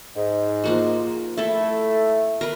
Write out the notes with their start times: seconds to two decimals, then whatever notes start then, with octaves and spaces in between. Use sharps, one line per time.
0.16 G#2
0.64 F3 A#3 F#4
1.38 A3 E4 A4
2.41 A#4 B4